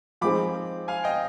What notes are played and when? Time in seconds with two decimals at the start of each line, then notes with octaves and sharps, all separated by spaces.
0.21 F3 G#3 C4 D#4 G#4 B5 D6
0.88 F5 G#5
1.04 D#5 G5